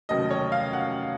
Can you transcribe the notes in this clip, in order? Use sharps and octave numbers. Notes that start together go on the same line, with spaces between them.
F1 D#2 C#3 F#3 D#5
C#5
F5
F#5